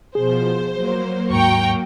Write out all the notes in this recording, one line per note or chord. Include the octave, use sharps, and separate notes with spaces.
B2 F3 G#4 C5
F#3 A#3
D#2 G#2 G5 A#5 C#6